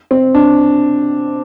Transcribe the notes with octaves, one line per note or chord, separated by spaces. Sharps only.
C4
D4